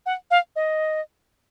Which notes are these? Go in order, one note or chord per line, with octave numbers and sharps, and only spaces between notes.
F#5
F5
D#5